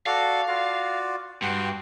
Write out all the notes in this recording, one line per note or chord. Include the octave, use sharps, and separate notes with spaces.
F#4 A4 D5 F5
F4 F#4 D5
G2 F#4 G5 C6